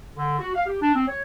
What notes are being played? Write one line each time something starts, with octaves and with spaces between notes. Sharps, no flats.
D3
F#4
F5
G4
D4
C4
C#5